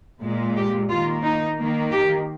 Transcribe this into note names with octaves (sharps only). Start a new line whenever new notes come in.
A#2 G#3
G4
D#3 A#3 F4
D#4
D#3 A#3
G4